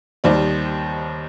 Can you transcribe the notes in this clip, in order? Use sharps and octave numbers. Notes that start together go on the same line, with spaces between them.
D#2 D#3 G3 C5 D5